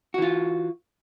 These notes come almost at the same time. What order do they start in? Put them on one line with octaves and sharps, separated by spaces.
F#4 E3 F4